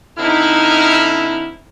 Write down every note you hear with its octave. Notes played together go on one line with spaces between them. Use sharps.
D3 C4 D#4 E4 F6